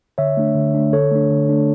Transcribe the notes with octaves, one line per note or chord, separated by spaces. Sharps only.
D3 C#5 E5
A3 D4
D3
A3 D4
D3 A4 C#5
A3 D4
D3
A3 D4